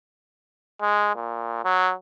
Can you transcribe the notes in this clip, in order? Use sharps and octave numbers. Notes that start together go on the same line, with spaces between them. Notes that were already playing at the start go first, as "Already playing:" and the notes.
G#3
A#2
F#3